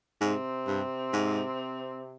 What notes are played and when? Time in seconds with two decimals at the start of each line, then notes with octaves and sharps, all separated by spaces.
0.21 G#2 C3 C4
0.67 G2
1.13 G#2